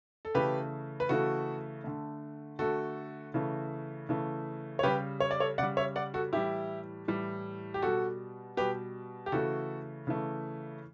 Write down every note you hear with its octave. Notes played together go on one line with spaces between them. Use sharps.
A4
C#3 E3 A3 G4 B4
B4
C#3 E3 A3 F#4 A4
D3 A3
D3 A3 F#4 A4
C#3 E3 A3
C#3 E3 A3
C#5
C#3 G3 G4 B4
C#5
D5
A4 C#5
C#3 G3 D5 F#5
C#5 E5
D5 F#5
F#4 A4
A2 E3 G3 E4 G4
A2 E3 G3
G4
B2 G3 F#4 A4
B2 G3 G4 B4
G4
C#3 E3 A3 F#4 A4
C#3 E3 A3